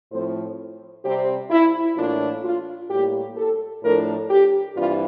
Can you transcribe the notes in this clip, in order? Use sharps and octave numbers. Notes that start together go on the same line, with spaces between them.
A2 F3 A3 C4 C5
C3 G3 C4 G4
E4
A2 E3 A#3 D4 F4
F4
A2 G3 A#3 G4
A4
A2 F3 A3 D4 A#4
G4
G2 E3 G3 C4 F4